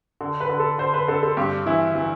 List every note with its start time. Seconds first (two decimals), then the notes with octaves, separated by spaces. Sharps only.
0.21 D3
0.41 B4
0.49 D3
0.59 A4
0.79 D3 C5
0.94 B4
1.08 D3 A4
1.23 A4
1.37 G2 G4
1.66 E3 E4
1.95 E3